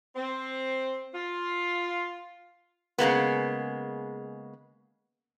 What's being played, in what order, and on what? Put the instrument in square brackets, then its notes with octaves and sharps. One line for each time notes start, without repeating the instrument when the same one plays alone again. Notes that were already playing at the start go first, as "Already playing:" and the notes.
[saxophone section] C4
F4
[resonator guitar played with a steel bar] C#3 G#3 A#3 B3